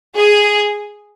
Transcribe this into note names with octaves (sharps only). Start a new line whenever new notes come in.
G#4